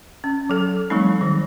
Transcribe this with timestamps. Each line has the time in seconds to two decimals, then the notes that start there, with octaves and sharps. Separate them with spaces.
0.24 C#4
0.49 F#3 A4
0.90 F3 G3 A3 C4 D#4
1.21 D#3 F#3